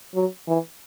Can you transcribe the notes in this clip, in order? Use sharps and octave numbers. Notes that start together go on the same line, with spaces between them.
F#3
E3